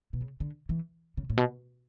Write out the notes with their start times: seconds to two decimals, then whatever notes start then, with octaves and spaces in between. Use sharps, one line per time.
0.13 B2
0.21 C#3
0.40 D3
0.69 E3
1.17 C#3
1.30 A2
1.37 B2